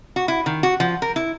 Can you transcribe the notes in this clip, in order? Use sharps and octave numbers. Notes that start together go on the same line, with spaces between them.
F#4
E4
D#3
F#4
F3
A#4
E4